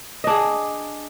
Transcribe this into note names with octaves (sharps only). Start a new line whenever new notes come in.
D4 G#4 D#5